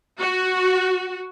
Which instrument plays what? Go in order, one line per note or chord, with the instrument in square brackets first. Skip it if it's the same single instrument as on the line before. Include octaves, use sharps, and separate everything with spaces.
[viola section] F#4